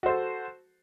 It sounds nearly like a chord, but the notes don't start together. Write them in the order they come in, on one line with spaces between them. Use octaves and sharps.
F#4 C5 A4